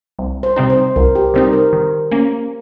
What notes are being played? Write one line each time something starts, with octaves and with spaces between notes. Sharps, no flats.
C2
C5
C3 G3 C4 D#4
C5
C2 A#4
G4
C3 G3 C4 D#4 C5
A#4
D#3
A#3 C#4